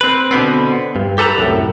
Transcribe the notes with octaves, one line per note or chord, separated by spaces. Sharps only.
C4 B4
B2 D3 B3 C4
G2
G4 A4 B4 A5 A#5
C2 F#2 A2